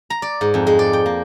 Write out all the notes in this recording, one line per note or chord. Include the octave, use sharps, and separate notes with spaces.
A#5
D5
G#2
F2
G#3
D5
G5
A#3